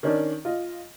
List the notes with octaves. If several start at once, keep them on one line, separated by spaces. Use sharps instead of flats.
D#3 C#4 D4
F4 D#5